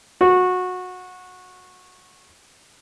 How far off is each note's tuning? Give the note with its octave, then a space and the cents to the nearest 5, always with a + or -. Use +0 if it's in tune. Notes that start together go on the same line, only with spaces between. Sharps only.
F#4 -20